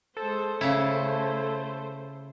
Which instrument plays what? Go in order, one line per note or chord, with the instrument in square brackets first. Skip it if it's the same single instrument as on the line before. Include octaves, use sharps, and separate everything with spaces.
[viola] G#3 C5 [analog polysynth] A4
[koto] C#3 E4 [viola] A3 C5